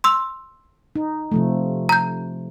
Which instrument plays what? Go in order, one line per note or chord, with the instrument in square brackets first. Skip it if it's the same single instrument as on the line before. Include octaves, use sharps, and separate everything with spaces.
[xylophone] C6 E6
[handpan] D#4
C3 F3 A3
[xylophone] A#5 G6